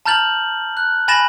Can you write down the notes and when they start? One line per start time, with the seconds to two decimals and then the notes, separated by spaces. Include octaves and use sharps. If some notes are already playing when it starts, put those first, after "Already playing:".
0.05 A5 A#5 F6 G6 A6 F#7
0.77 F#6
1.08 G#5 B5 A6 A#6 E7 F#7